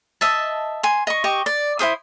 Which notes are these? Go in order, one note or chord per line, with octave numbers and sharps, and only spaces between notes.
D#5 E5 A5
G#5 C6
D#5 C#6
G4 D#5 C#6
D5
E4 G#4 C5 D#6